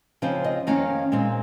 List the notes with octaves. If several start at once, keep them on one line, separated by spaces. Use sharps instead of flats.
C#3 F3 C4 D#4 C5
D#5
F2 D#3 A#3 C#4 F5
A#2 G#3 C4 D#4